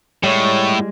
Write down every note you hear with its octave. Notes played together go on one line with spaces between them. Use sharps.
A2 G3 G#3 C#5